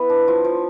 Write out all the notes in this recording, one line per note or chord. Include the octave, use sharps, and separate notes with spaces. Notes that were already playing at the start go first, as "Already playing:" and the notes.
Already playing: B3 E4 B4
D4
F3
F3